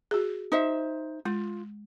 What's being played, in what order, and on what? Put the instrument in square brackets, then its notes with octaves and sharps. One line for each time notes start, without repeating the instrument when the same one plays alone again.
[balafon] F#4 G#4
[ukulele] D#4 C5 E5
[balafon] G#3 [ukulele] F4